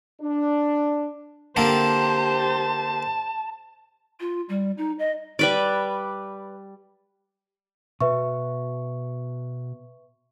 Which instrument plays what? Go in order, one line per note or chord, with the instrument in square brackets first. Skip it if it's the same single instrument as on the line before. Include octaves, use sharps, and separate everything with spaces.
[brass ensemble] D4
[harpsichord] D3 A#3 C4 [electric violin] G4 C5 [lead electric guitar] A5
[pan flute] F4
G3
D#4
D#5
[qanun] G3 B4 D5
[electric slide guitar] B2 F#4 [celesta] B4 E5 C#6